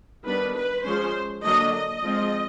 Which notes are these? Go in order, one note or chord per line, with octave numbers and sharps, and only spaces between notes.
D#3 G3 B3 D4 B4
B4
F3 G#3 C#4 C5
D3 F#3 A#3 D4 D#5
D#5
F3 G#3 C4